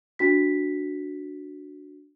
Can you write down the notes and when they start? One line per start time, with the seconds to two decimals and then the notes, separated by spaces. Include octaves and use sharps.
0.19 D4 F#4 B6